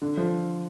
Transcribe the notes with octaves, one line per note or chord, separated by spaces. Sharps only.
D3
F3